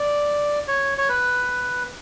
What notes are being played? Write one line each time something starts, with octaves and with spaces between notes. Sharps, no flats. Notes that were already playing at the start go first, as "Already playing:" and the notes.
Already playing: D5
C#5
C#5
B4